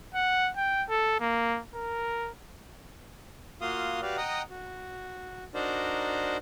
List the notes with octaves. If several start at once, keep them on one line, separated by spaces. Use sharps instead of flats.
F#5
G5
A4
A#3
A#4
A#3 F4 F#4 F5 C6 D#6
F#4 G4 B4 D5 F5
D#5 F#5 G5 A#5 D#6
F#4
D4 D#4 F#4 A#4 C5 D5